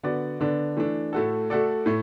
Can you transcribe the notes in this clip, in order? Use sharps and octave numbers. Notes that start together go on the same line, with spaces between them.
D3 B3 F#4 D5
D3 B3 D4
E3 A3 D4
A2 A3 F#4 A4
A3 F#4 A4 D5
A2 A3